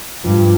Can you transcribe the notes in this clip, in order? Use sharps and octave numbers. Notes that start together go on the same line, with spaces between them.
G2 F3